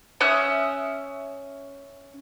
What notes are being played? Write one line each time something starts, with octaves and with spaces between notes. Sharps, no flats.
C#4 E5 D#6 F#6